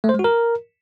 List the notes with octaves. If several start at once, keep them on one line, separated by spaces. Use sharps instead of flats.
A3
C5
G#3
F#4
A#4